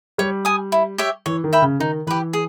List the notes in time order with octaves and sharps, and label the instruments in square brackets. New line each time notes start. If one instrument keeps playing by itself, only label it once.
[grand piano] G3 [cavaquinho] C#5
[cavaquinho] G#5 D#6
E4
G4 C#5 E5
[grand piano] E3 [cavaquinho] C#5
[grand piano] D#3
[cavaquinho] E5 G5 B5
[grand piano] C#3
[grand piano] D#3 [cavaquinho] D#4
[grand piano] E3 [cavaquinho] G4 B4
[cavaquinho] G#4